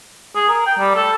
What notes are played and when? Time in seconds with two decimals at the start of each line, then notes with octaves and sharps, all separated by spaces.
0.35 G#4
0.49 A#4
0.67 G5
0.79 G3
0.96 A4